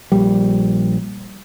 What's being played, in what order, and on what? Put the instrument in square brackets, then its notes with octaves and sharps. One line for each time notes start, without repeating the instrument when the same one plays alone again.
[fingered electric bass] A#1 G3